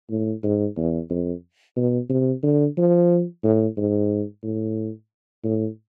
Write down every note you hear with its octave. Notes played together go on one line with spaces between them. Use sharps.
A2
G#2
E2
F2
B2
C3
D3
F3
A2
G#2
A2
A2